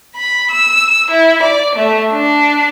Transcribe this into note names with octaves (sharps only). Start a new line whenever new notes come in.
B5
E6
E4
D5
A3
D4